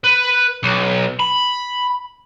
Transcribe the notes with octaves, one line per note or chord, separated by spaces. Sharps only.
B4
B1
B5